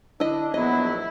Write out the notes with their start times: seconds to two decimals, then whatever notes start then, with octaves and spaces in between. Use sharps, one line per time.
0.20 D3 D4 E4 D#5
0.54 A#1 E2 F#3 B3 E4 D#5